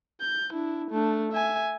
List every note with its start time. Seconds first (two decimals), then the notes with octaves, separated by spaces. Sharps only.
0.21 G6
0.53 D4 E4
0.91 A3 D4
1.32 E5 G#5